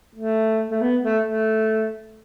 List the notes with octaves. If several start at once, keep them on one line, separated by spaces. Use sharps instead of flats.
A3
A3
B3
A3
A3